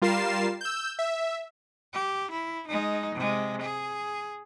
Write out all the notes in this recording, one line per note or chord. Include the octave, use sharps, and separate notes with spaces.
G3 F4 A#4 A6 C7 E7
E6 G6
E5
G4
E4
G#3 D#4
C3 G#3
G#4